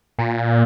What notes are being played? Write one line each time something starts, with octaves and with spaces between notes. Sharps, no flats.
A#2